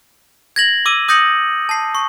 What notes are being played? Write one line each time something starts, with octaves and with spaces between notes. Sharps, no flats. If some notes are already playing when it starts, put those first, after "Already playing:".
G#6 A#6 F#7
D6 E6 D#7
D#6 G6 A#6 C#7 F#7
A5 C7
C#6